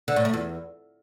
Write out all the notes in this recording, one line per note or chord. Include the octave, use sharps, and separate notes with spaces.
D3
A2
A3
E2